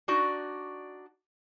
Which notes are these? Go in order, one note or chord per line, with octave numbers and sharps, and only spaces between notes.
D4 D#4 F#4 D5